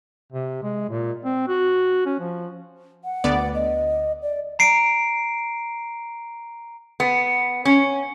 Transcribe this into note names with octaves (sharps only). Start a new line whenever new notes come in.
C3
G#3
A#2
C4
F#4
C#4
F3
F#5
D2 B3 D5
D#5
D5
A#5 C7 D7
B3
C#4